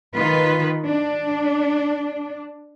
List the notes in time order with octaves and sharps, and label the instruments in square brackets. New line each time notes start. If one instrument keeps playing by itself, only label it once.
[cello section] D#3 F4 B4
D4